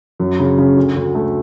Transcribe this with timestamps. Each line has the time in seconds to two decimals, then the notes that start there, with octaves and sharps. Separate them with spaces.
0.20 F#2
0.39 C#3
0.58 C#3
0.76 D2
0.96 D2
1.15 A3